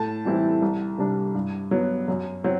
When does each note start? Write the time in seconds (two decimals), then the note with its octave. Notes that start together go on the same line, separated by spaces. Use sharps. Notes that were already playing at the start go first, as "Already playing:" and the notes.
Already playing: A2 A5
0.25 E3 G3 C4 E4
0.62 C2
0.98 C3 G3 D4
1.35 G2
1.71 F#3 B3
2.08 F#2
2.44 F#3 C4